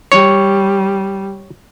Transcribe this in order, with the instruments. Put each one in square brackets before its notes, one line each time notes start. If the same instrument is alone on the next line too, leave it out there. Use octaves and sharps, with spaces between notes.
[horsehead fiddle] G3 [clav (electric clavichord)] C#5